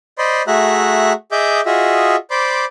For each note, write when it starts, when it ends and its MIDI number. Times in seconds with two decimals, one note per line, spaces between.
0.18 0.42 72
0.18 0.42 74
0.18 0.42 75
0.18 0.42 83
0.18 0.42 84
0.47 1.13 57
0.47 1.13 66
0.47 1.13 68
0.47 1.13 76
0.47 1.13 82
0.47 1.13 90
1.32 1.61 68
1.32 1.61 75
1.32 1.61 76
1.32 1.61 86
1.32 1.61 91
1.66 2.16 65
1.66 2.16 66
1.66 2.16 68
1.66 2.16 75
1.66 2.16 76
2.31 2.65 72
2.31 2.65 74
2.31 2.65 83
2.31 2.65 84
2.31 2.65 86